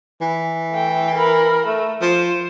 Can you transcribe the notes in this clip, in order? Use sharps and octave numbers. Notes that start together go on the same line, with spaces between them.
E3
A3 G5
A#4 B5
A3
F3 C5